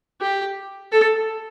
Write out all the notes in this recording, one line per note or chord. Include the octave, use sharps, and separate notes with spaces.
G4
A4